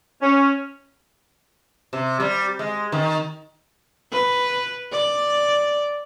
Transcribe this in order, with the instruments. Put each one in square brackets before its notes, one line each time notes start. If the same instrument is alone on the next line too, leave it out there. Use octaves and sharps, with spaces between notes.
[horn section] C#4
[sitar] C3
G3
G#3
D#3
[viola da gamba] B4
D5